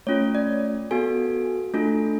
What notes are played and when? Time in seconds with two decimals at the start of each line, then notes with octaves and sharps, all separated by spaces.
0.07 A3 C#4 F4 C#5
0.35 D5
0.91 B3 F#4 A4 G#5
1.74 A3 D4 F4 A4